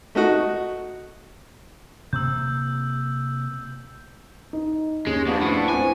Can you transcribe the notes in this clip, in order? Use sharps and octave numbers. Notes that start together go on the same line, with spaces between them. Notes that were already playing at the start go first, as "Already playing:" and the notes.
A3 D#4 F#4
C3 A#3 E6 G6
D#4
D#2 G#3 C#4
F#2 F3 B3 D4
A2
C4 E4 G#5